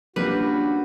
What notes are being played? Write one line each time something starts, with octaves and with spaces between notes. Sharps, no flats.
G3 A#3 C#4 D4 F4 F#4 B4